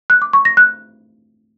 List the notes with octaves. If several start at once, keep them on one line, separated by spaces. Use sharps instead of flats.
F#6
D6
C#6
A#6
F#6